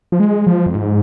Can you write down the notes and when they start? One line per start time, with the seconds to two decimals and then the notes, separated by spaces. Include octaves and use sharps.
0.12 F3
0.20 G#3
0.47 F3
0.66 F2
0.75 G#2